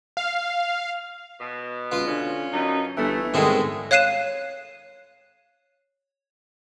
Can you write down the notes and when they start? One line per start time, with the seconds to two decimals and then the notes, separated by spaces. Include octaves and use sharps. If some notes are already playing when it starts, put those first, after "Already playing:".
0.17 F5
1.40 B2
1.92 C#2 F4 B4
2.07 D3 C#4
2.53 F#2 B2 E3 D#4
2.97 G1 E3 A3
3.34 C2 G#2 D#3 G#3 A3
3.91 C#5 F5 F#6 C7 D#7 E7